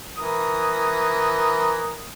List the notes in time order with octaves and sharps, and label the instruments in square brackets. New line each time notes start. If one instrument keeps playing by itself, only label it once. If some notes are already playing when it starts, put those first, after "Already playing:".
[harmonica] E3 A#4 D#6